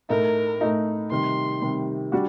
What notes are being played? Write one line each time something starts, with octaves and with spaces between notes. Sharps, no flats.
A2 A3 D#4 A#4
A2 A3 D#4
C3 D#3 G3 C6
C3 D#3 G3
G3 D4 F#4